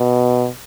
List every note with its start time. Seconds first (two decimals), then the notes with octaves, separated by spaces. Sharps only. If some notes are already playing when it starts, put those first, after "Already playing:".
Already playing: B2